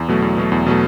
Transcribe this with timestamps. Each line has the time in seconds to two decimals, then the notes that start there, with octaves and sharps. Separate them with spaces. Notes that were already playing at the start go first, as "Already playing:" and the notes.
Already playing: E2
0.08 B2 F#3 A3
0.22 E2
0.37 B2 F#3 A3
0.52 E2
0.66 B2 F#3 A3